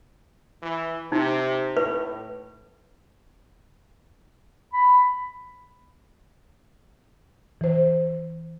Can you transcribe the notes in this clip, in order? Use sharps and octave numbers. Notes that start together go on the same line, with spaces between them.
E3
C3 D#4
A2 B4
B5
E3 C5